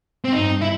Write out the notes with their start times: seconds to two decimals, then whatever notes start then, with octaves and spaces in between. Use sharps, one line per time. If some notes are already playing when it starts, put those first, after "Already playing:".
0.25 C4
0.33 G2 D#4
0.61 E4